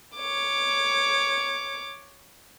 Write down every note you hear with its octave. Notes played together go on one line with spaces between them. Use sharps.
C#5 D6